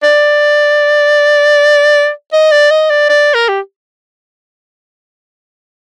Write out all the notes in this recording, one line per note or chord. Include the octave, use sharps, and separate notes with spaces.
D5
D#5
D5
D#5
D5
D5
A#4
G4